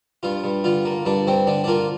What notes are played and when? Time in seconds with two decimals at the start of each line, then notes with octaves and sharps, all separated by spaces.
0.23 G2 F4
0.44 G2
0.64 D3 F4
0.85 A#3
1.05 G2 D4
1.27 G2 C4
1.47 D3 D4
1.64 D4
1.68 A#3 F4